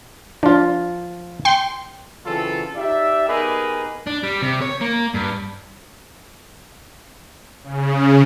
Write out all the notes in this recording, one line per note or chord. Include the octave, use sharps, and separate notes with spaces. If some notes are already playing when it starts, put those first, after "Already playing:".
F3 D4 F4
G5 C6
C#3 E3 F#3 C4 F4 A4
D#4 G4 D5 E5
B3 D#4 G4 G#4 A#4 B4
D4
G3
C3
C#5
A#3
G2
C#3